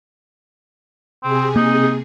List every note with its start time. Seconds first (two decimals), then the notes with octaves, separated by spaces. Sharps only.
1.23 C3 C4 G#4
1.56 A#3 D#4